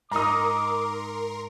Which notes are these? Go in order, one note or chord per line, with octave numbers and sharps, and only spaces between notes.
G#2 D#4 A#4 A#5 C6 D6 D#6